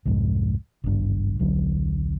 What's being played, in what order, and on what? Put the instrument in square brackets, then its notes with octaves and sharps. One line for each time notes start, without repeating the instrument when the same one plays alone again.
[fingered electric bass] C2 F2 G#2
G#1 C#2 G2 D4
D#1 B1 D3 F#3